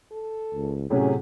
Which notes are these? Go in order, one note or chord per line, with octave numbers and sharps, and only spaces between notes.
A4
C#2
A2 C3 F#3 C#4 G#4